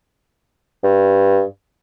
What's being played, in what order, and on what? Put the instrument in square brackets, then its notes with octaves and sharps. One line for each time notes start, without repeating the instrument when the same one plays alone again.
[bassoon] G2